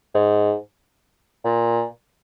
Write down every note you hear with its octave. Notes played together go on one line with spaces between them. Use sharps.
G#2
A#2